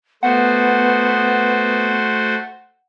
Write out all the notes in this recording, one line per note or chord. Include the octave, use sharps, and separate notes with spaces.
A3 B3 F#4 C5 F#5